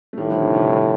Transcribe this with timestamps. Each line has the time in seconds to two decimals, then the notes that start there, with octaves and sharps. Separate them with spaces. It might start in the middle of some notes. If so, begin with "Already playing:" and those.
0.13 A3
0.18 A2 D#3 G3
0.30 D3 F3
0.42 C3 D#3
0.54 C3 D#3
0.66 D#3 G3